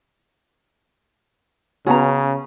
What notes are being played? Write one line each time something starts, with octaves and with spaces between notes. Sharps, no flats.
C#3 B3 C#4 F#4 A#5